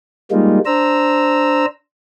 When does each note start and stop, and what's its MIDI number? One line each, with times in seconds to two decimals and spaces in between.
0.31 0.59 55
0.31 0.59 56
0.31 0.59 58
0.31 0.59 63
0.31 0.59 65
0.66 1.66 62
0.66 1.66 72
0.66 1.66 82
0.66 1.66 88